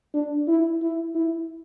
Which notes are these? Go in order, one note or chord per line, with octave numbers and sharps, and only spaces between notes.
D4
E4
E4
E4